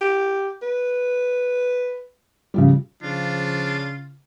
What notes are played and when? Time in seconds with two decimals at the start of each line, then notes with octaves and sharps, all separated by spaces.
0.01 G4
0.62 B4
2.54 C#3 F3 G3
3.03 C#3 F3 D4 F4